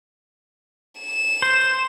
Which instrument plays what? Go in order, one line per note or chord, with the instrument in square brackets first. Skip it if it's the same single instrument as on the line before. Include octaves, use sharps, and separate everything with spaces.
[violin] E7
[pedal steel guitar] C5